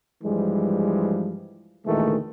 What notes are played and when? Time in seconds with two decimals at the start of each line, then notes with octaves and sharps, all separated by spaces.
0.24 G2 E3 F3 G3 G#3
1.86 D2 A#2 D#3 E3 G#3 A3